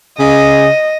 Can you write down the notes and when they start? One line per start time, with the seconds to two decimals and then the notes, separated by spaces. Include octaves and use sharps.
0.20 C#3 D#5